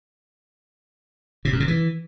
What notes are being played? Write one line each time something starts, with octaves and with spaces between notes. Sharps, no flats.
C3
F#2
C3
E3